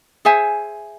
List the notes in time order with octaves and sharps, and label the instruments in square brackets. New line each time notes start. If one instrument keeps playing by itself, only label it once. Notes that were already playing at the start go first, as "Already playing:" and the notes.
[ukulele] G#4 C5 E5 G#5